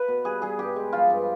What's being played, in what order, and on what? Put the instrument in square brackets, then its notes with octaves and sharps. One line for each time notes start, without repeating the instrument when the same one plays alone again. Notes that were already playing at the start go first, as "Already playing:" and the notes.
Already playing: [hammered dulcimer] B4
B2
G3 G#4
G3 G#4
G2 G4
G#3
F3 F4
G2